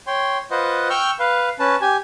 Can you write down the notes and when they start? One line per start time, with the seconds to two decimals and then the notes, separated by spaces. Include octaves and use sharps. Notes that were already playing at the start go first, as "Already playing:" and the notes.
0.07 C#5 G5 C6
0.51 F4 B4 C5 D#5 F#5
0.90 G5 C#6 E6 F6 G6
1.19 B4 F5
1.60 C#4 B4 A5
1.81 G4 G#5